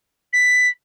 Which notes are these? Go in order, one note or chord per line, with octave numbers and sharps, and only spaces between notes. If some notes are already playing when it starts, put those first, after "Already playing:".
B6